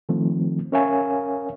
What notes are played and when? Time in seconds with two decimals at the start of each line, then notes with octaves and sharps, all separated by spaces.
0.09 D#3 F3 A3 C4
0.72 C#4 A#4 C#5 E5 F5 G#5